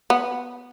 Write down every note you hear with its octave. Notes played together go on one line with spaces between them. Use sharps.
B3